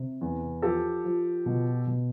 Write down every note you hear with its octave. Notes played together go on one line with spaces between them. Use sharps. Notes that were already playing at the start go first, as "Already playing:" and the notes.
Already playing: C3
E2
F3 G4 A4
F3
B2
B2